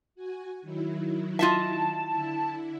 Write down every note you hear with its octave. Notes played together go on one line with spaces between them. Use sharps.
F#4 G#5
D#3 F#3 E4
F4 D#5 E5 A5
D3 E4